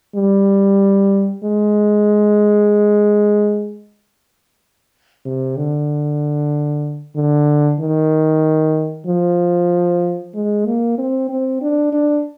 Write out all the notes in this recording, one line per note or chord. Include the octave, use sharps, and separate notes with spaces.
G3
G#3
C3
D3
D3
D#3
F3
G#3
A#3
C4
C4
D4
D4